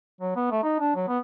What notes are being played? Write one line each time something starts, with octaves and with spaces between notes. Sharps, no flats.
F#3
B3
A3
D#4
D4
F#3
B3